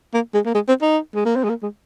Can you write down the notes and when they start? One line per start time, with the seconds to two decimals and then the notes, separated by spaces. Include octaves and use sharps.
0.14 A#3
0.34 G#3
0.45 A#3
0.55 G#3
0.68 C4
0.81 D#4
1.15 G#3
1.25 A#3
1.36 C4
1.44 G#3
1.49 A#3
1.63 G#3